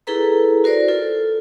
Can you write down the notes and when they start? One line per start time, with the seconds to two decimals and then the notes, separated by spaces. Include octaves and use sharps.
0.07 E4 G#4 A4 B4 A#5
0.64 F#4 A#4 C5 D5
0.88 F4 A4